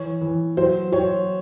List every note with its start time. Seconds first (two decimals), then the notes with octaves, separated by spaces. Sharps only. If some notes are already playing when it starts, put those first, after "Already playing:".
Already playing: E3 C#5
0.21 E3
0.57 F#3 C5
0.92 F#3 C#5